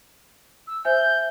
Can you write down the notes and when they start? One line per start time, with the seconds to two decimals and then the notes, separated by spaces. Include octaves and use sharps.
0.67 E6
0.85 C5 E5 G#5 G6